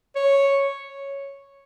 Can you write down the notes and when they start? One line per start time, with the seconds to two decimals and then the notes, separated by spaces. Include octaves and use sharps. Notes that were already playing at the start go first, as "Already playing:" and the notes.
0.16 C#5